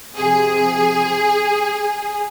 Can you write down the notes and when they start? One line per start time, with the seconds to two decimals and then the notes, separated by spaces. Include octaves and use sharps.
0.16 C3 F3 G#4